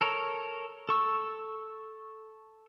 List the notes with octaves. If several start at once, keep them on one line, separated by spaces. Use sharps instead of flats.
A4 A#4 C#5
A4 C#6 E6